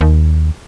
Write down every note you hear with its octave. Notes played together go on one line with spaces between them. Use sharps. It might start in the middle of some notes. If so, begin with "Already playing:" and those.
D#2